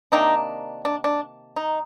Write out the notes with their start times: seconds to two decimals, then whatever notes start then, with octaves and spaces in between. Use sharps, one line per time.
0.12 C3 D#3 A#3 D4 D#4
0.85 D4
1.04 D4
1.56 D#4